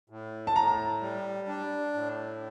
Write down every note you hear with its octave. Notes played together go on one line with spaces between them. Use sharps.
A2
A5
A2 A#5
G3
D4
A2